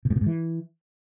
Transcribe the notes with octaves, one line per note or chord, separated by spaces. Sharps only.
B2
G#2
B2
G#2
E3